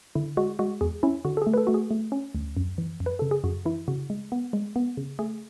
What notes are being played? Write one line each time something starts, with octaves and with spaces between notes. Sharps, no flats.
D3 E4
G#3 F#4
G#3 F#4
E2 G#4
C#4 E4
D3 F#4
A4
A3 G#4
B4
A4
A3 F#4
G#4
A3
C#4
D2
F#2
E3
F#2
B4
C#3 A4
G#4
F#2 F#4
E3 E4
C#3 F#4
G#3
B3
G#3
B3
C#3
A3 G#4